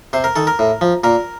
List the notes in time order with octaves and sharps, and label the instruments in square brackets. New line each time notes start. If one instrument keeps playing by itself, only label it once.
[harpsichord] C3 C5
A#4
D#3 A4
A#4
A2
F3
A#2 A#4